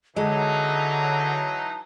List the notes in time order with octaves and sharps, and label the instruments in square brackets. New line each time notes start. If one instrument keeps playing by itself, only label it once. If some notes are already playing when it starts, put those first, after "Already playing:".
[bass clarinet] D3 [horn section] E3 F#3 D#4 [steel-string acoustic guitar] G#3 [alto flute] A5